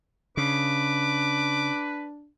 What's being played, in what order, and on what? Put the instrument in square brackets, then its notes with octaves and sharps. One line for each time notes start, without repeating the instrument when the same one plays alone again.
[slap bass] C#3 [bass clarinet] D4 [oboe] B4 [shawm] D6